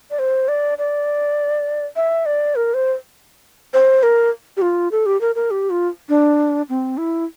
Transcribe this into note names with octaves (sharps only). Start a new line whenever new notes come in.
D5
C5
D5
D5
E5
D5
A#4
C5
C5
A#4
G4
F4
A4
G4
A#4
A#4
G4
F4
D4
C4
E4